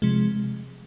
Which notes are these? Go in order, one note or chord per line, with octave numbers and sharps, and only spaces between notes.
C3 F3 G#3